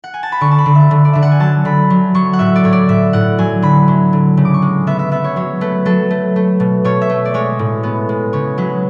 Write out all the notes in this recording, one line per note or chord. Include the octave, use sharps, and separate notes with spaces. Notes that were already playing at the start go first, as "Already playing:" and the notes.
F#5
G#5
A5
B5
D3 C#6
A5
B5
D3
E5
D3
D5
D3 E5
F#5
G#5
F#3 A5
D3 B5
F#3
F#3 C#6
F#5
A2 E5
D5
A2 C#5
D5
A2 E5
A2 F#5
F#3 G#5
D3 B5
F#3
D3
C#3
D6
C#6
G#3
B3 E5
E5
B3 E5
C#5
F#3 C#5
A3 B4
F#3 A4
A3
A3
B2
B2 C#5
E5
A3
D5
G#3 C#5
A2
B3
G#3
C#3 C#5
F#3 B4